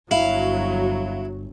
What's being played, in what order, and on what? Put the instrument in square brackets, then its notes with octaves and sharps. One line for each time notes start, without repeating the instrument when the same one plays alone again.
[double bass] G1 [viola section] F#3 [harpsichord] E4 [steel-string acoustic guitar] F5